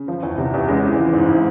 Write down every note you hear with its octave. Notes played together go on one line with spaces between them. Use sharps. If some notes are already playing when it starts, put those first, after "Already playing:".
Already playing: C#3
F3
E2
C3
E2
C#3 G#3
E3 C4
F3
G#2
E4